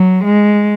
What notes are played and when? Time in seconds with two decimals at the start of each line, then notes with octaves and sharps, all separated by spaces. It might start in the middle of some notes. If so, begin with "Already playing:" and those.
Already playing: F#3
0.25 G#3